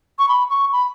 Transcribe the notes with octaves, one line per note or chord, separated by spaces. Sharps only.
C#6
B5
C#6
B5